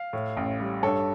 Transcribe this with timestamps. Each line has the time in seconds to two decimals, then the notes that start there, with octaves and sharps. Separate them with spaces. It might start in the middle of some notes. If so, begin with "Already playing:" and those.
Already playing: F5
0.13 A2
0.37 A1
0.60 G3
0.83 G2 A4 C#5